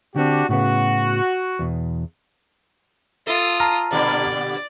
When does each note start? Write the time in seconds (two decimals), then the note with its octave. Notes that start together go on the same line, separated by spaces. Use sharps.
0.16 D3 C4 D4 F#4 G4
0.49 A2 C#3 B3 F#4
1.59 E2 B2
3.27 F4 A4 D#6
3.60 A5 A#5 F6
3.92 A#2 D3 G3 D5